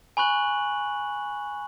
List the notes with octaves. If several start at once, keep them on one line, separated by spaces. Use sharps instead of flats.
G#5 B5 C#6 F#6 F#7